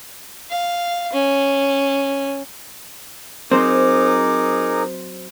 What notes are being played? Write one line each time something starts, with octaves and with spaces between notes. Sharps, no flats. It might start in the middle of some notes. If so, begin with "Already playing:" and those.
F5
C#4
F#3 C4 D#4 G#4 A#4 C5 D6